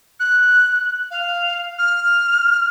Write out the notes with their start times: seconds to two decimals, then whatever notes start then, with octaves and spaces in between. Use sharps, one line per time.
0.20 F#6
1.11 F5
1.78 F6